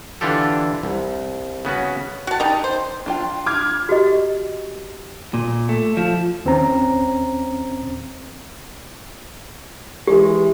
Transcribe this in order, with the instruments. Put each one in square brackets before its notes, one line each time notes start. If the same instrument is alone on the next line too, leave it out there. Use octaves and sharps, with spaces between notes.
[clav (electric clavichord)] D3 E3 D4 F4 G4 A4
C2
C#3 B3 C#4 F#4
[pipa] F#4 A5
G3 D#4
C5
[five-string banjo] D4 F4 G5
[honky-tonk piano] D6 F6 G#6
[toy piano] F#4 G4 D#5
[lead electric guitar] A#2
A3
F3
[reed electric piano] D#2 C4 C#4 C5 A#5
[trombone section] E3 G#3 [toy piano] G4